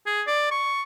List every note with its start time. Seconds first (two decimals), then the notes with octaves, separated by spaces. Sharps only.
0.06 G#4
0.27 D5
0.51 C#6